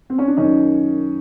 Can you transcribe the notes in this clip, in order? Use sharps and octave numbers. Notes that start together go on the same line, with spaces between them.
C4
C#4
D4
F#2 D#3 C#4 D#4